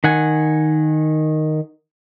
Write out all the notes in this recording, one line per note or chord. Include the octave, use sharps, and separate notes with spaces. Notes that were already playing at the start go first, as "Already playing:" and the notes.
D#3 F#5 G#5